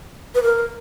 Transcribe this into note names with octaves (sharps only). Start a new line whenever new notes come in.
B4
A#4